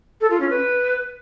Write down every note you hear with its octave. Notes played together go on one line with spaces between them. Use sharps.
A4
F4
C#4
B4